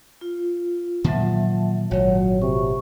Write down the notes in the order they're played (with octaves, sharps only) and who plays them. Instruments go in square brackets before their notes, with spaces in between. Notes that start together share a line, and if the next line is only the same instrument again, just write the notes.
[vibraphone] F4
[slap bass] A#2 D#3 F3 [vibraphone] F#3 E5 A5
[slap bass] G#1 A#2 [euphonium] F#3 [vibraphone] C#5
[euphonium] C3 [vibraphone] C#6